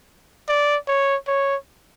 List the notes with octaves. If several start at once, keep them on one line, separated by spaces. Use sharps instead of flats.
D5
C#5
C#5